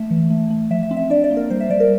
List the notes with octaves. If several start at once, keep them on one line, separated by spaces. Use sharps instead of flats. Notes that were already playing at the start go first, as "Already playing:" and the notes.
Already playing: A3 E5
E3
A3
A3
F3 E5
E5
C4
E5
D4 D5
D5
A#3
A#4
G3 C5
E5
G3 D5
A#4